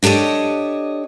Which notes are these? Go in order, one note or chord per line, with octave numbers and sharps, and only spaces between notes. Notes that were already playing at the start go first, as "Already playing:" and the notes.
D4 G4 A4 C#5 D#5